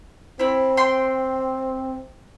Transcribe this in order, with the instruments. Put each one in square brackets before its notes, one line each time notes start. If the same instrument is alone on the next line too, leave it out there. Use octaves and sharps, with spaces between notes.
[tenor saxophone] C4 [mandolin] E4 B5
[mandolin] G5 C6